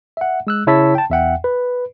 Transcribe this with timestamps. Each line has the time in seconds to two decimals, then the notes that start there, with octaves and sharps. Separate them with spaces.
0.17 E5 F#5
0.47 G#3 E6 F#6
0.67 C#3 E4 C#5 A5 E6 B6
0.95 G5 A5
1.10 E2 E5 F#5 G5
1.44 B4